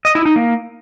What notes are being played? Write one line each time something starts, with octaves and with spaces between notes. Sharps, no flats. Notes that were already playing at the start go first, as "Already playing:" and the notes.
D#5
E4
D#4
A#3